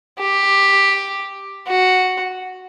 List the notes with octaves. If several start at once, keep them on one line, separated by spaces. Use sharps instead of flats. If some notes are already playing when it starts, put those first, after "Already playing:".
G4
F#4